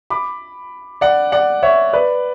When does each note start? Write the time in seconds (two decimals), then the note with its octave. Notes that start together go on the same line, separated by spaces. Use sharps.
0.10 B5 D6
1.01 D5 F#5
1.32 D5 F#5
1.63 C#5 E5
1.93 B4 D5